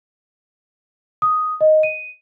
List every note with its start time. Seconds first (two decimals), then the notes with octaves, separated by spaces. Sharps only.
1.22 D#6
1.61 D#5
1.83 D#7